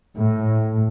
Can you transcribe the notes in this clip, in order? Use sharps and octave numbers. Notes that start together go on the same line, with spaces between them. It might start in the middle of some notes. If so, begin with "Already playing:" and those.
A2